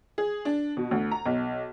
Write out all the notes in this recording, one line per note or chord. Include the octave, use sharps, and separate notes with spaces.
G#4
D4
B2
D2
A#5
B1